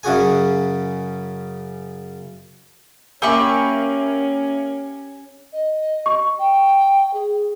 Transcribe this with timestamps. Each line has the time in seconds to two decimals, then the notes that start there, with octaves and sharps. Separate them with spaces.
0.03 F#2 C#3 F#4 G#4 G#5
3.22 A#3 C#4 G4 E5 G#5 B5 C#6
5.53 D#5
6.06 C#6
6.39 G5
7.14 G#4